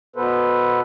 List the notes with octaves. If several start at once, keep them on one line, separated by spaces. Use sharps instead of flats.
B2 B3 A4 B4 C5